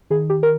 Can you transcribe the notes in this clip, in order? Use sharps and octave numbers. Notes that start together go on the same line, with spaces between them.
D#3 G#4
G4
A#4